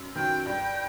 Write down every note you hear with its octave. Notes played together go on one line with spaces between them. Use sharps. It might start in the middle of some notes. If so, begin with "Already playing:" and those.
Already playing: F#2
D#3 F#3 G5
G2 G5